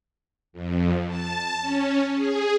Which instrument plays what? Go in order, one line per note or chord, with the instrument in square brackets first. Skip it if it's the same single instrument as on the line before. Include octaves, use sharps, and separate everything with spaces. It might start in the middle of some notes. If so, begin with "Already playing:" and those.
[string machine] F2
A5
C#4
G#4